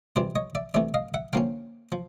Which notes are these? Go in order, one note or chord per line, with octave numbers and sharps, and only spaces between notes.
F2 C3 E3 G3 C5 D5
C#5 D#5
D5 E5
C3 E3 A3 D5 E5
D#5 F5
E5 F#5
D3 F3 A#3 C#4 F5 G5
F3